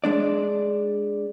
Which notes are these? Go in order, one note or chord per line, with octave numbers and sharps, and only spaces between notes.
G#3 D4 D5